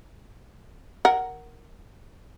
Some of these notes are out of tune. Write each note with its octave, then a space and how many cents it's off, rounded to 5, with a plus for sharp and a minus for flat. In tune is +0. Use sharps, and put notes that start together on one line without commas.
A#4 +0 F#5 +10